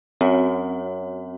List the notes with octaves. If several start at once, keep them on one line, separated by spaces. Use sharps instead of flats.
F#2 C4 F#4 C#5